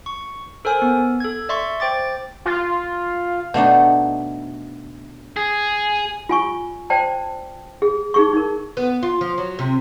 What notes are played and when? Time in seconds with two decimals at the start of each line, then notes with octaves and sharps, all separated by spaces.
0.06 C#6
0.65 A4 A#4 C5 G#5
0.82 B3
1.20 A4 G#6
1.49 D5 E5 C6 C#6
1.80 C5 G5 D6 A6
2.46 F4
3.54 B2 A3 D4 D#4
5.37 G#4
6.29 F4 G#5 C#6
6.90 C5 D5 G5 A5
7.82 G#4
8.14 D#4 G#4 C#6
8.33 D#4 A#4
8.77 B3
9.03 F4
9.21 F3
9.38 F#3
9.59 C3